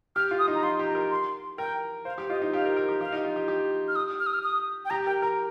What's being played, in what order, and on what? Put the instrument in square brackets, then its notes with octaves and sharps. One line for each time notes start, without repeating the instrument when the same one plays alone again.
[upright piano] G4 [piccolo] F6
[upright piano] F4
[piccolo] D#6
[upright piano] D#4
[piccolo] A#5
[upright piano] F4 [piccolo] C6
[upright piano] G4
[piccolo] A#5
[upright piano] A#4
[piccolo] C6
[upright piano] A#4 [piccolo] G5
[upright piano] C5 [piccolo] F5
[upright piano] G4
[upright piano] F4 [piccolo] D#5
[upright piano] D#4
[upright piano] G4 [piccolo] F5
[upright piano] A#4
A#4
G4
[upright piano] G4 [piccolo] F5
[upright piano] D#4
F4
G4
G4
[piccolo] F6
D#6
F6
D#6
F6
D#6
G5
[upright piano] G4 [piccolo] A#5
[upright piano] A#4 [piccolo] G5
[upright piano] A#4 [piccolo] A#5